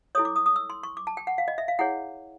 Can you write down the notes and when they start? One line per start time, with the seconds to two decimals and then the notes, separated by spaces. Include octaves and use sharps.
0.15 C#5 D#6
0.18 E4 A4
0.25 D6
0.36 D#6
0.46 D#6
0.56 E6
0.70 C6
0.83 C#6
0.97 D6
1.07 A5
1.17 G5
1.27 F#5
1.38 F5
1.48 D#5
1.58 E5
1.68 F5
1.79 E4 G#4 C#5 F#5